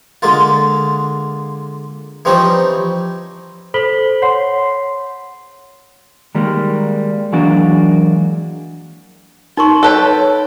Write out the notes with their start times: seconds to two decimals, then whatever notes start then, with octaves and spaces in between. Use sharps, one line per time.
0.22 D3 G#3 A#3 F4
2.25 E3 F3 G3 C4 C#4 D#4
3.74 A4 C5 B5 B6 F#7 G7
4.22 C#5 F#5 C6 C7
6.35 D#3 G3 G#3 A#3
7.33 E3 F#3 G#3 A#3 D4 F#4
9.57 D#4 A#4 C6 C#6
9.83 A4 B4 C#5 G5